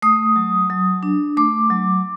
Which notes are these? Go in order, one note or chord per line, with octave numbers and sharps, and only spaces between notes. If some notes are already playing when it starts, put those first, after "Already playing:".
A3 D#6
F#3
F#3
D4
A3 D6
F#3